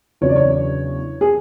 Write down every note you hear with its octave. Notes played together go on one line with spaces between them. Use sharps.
E2 C#3 F#3 B3 D4 C#5
D5
C#5
G#4